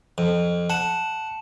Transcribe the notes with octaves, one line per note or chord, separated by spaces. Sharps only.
F2
F#5 A5 E7